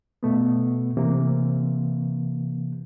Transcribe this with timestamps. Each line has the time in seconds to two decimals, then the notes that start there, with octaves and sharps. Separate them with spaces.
0.23 B2 A3 B3
0.97 C3 E3 A#3